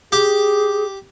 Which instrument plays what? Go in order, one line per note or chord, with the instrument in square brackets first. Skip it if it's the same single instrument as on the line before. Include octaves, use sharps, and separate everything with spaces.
[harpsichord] G4 [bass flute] G#4